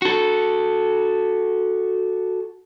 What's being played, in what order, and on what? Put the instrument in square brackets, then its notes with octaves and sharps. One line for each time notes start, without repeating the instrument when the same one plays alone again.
[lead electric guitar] F#4 A4